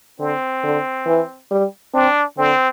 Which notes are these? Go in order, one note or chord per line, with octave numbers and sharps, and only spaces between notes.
D3 C4
D3
E3
G3
C4 D4
D3 C4